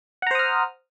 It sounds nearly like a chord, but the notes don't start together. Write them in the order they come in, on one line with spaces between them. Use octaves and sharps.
F#5 A#5 C5 D#6 F6